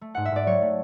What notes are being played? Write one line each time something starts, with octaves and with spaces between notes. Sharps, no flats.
A3
G#2 F#5
E5
G#2 D5
F#3 C#5
A3